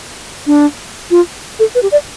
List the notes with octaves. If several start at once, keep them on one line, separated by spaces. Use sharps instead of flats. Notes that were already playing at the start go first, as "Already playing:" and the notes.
D4
F4
A4
B4
G4
D5